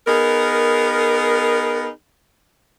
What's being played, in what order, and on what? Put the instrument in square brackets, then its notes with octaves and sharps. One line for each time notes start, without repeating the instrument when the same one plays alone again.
[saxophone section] B3 D#4 G#4 A#4